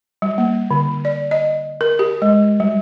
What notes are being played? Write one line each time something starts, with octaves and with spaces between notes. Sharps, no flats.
G3
A#3
D3
D5
D#5
A#4
G4
G#3
G3